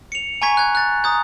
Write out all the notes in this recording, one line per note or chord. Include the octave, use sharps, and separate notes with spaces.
C#7 F7
G#5 A#5 C#6 G#6 B6
F#6 G#6
F#6 A6
A#5 D#6 G6